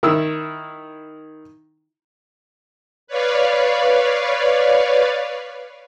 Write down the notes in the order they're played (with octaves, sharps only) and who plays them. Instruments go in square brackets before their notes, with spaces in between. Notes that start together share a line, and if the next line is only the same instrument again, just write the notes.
[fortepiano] D#3 E4 E6
[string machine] B4 C#5 D5 F5